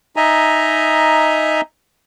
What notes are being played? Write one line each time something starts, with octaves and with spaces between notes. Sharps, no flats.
D#4 D#5 E5 G#5 A#5